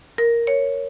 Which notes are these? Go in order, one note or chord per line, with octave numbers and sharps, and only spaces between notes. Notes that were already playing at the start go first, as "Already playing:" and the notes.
A#4
C#5